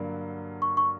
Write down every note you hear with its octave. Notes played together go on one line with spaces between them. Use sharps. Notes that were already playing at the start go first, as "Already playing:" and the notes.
Already playing: G2 D3 F#3 A#3
C#6
C#6